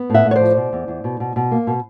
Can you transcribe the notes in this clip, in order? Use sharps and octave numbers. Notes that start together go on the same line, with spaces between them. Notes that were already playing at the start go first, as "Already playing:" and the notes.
Already playing: B3
A2 E5 F#5
A2
C#5
C5 D5
F3
B2
E2
E2
B2
B2
B2
A#3
B2